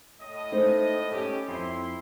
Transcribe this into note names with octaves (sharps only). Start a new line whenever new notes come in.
A2 D#5
A3 D#4 C5
C#4 G4 A4
F2 E4 C6